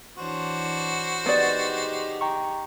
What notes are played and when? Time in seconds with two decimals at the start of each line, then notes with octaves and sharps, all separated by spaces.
0.18 E3 D4 F#4 C5 C#5
1.26 B3 D#4 G4 G#4 D5
2.21 G5 A#5 C#6